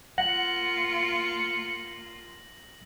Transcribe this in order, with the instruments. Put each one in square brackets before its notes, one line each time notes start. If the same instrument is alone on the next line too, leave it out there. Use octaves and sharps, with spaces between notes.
[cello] A#3 F4 [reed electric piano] F#5 [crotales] A#6 F#7 [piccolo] C#7